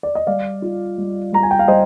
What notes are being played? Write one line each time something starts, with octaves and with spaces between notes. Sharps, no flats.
D5
D#5
G3 D5 F5
F4
G3
G3 A#5
G#5
G5
F5
G3 C5 D#5